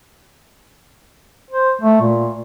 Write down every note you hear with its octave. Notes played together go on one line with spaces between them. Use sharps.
C5
A3
A#2